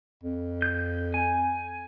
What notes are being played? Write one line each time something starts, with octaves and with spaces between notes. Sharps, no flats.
F2
G6
G#5